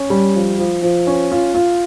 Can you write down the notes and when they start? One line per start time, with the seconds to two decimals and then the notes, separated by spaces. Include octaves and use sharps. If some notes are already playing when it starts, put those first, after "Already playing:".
Already playing: C#4
0.10 G3
0.35 F3
0.58 F3
0.82 F3
1.07 C#4
1.32 F4
1.55 F4